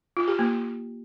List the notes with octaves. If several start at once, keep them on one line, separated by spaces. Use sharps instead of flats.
F4
G4
A#3